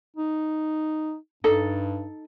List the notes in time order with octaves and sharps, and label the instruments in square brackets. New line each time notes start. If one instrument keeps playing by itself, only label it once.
[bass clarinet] D#4
[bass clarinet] G2 [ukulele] D#4 A4